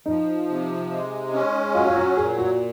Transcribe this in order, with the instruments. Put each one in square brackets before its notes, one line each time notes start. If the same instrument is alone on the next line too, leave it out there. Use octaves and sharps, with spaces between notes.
[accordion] F3 [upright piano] D#4
[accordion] C3
G#3
C#4
[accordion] F#3 [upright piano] F4
[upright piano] F4
F#4
[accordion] A#2 [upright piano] G#4
[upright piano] F#4